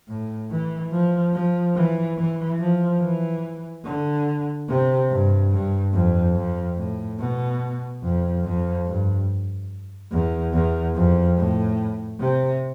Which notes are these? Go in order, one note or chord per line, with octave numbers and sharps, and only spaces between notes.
A2
E3
F3
F3
E3
E3
F3
E3
D3
C3
G2
G2
F2
F2
A2
B2
F2
F2
G2
E2
E2
F2
A2
C3